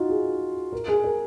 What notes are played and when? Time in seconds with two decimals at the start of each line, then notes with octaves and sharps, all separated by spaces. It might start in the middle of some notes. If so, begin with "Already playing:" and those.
Already playing: D#4 F4 F#4
0.10 G#4
0.73 A#4
0.88 G#4
1.04 A#4